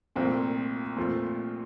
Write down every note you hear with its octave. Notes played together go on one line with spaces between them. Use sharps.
C2 A#2 F3 A3 C4
A#2 F3 A3 C4 F4